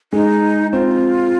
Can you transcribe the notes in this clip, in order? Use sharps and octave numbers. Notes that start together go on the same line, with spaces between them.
G#3 D#4 G#4
C4 F4 C5